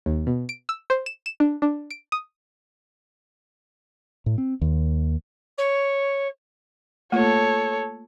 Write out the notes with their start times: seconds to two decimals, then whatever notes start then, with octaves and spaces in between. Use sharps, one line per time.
0.06 D#2
0.27 B2
0.49 D7
0.69 E6
0.90 C5
1.06 E7
1.26 E7
1.40 D4
1.62 D4
1.90 D7
2.12 D#6
4.26 A2
4.38 C4
4.62 D#2
5.58 C#5
7.12 A3 A#3 F4 A4 C#5